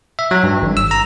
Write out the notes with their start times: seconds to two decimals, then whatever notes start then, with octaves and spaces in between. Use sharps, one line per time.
0.19 E5
0.31 F#3
0.43 G2
0.62 G#1
0.77 E6
0.91 A#5